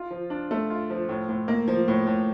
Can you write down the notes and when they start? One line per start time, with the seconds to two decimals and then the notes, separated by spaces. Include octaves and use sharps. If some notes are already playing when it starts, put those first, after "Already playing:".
Already playing: F4
0.11 F3
0.30 D4
0.51 A3
0.70 F4
0.90 F3
1.09 A2
1.29 A2
1.48 A#3
1.68 F3
1.88 A2
2.07 A2